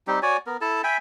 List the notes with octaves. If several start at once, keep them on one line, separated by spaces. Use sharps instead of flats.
G3 C4 D#4 G4
F#4 C#5 D5 G#5
B3 A#4
E4 A4 A5
E5 G5 G#5 B5